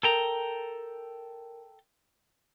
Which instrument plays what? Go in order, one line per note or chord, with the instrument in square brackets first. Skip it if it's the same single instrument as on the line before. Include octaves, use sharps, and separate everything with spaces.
[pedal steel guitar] A4 G5 A#5 [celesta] A#4